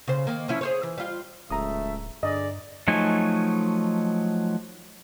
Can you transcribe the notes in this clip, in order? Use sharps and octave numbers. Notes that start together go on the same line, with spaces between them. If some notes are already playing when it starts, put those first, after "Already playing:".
C#3 C5
D#3 A#3
F3 C#4 E4
G#4 C5 C#5
E3
G3 F4
D1 C#2 A3 E5 A#5 D#6
G2 D3 G#4 D5 D#5
F3 F#3 A3 D#4 G#5